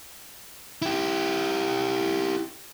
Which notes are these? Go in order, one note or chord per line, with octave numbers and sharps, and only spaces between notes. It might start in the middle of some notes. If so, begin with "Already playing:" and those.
E4 G4